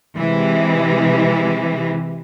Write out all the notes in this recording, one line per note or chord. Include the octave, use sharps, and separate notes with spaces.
C3 E3 G#3